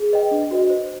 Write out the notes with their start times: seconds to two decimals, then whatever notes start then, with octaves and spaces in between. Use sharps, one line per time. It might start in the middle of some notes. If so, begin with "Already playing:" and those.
Already playing: G#4
0.12 B4 D#5 G5
0.31 D4
0.51 F#4 B4 D#5
0.70 C5